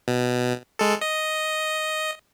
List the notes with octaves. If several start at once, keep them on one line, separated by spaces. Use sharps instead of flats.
B2
G#3 A4
D#5